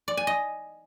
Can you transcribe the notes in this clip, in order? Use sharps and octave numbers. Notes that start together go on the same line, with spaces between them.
D5
G#5
D#5